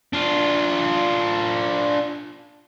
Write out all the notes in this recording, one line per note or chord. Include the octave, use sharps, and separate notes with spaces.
D4 F4